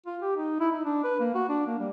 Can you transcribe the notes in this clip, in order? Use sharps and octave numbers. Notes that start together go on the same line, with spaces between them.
F4
G4
D#4
E4
D#4
D4
B4
A#3
F#4
D4
A#3
G3